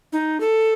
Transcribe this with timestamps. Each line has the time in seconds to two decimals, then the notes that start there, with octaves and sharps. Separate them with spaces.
0.13 D#4
0.41 A4